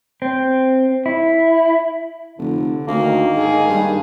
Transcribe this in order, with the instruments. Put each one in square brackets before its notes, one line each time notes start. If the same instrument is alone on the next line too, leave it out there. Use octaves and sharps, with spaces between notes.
[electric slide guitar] C4
E4
[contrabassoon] F1 [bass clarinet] D3
[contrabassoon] D2 [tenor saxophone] D#3 [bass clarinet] A#3
[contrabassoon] G#2 [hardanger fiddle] G#4
[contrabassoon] G2